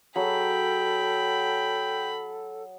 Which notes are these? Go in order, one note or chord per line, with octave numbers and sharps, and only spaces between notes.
F#3 G#4 A4 F#5 G5 B5